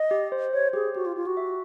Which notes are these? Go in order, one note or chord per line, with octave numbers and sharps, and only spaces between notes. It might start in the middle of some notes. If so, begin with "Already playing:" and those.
Already playing: D#5
G4
C5
C5 C#5
G4 G#4
F#4 G4
F4
F4 G4
F#4
E5